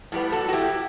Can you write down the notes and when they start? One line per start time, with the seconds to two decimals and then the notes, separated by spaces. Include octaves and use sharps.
0.12 A2 G3 B3
0.32 F#4 A4
0.49 F#4
0.53 E4 G4